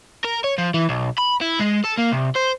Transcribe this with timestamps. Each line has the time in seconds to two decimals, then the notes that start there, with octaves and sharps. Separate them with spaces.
0.25 A#4
0.44 C#5
0.58 F3
0.74 E3
0.89 B1
1.18 B5
1.41 E4
1.60 G#3
1.85 A4
1.98 A#3
2.12 C2
2.36 C5